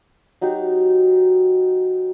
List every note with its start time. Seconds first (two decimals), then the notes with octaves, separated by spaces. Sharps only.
0.41 F#3 D#4 F#4 G4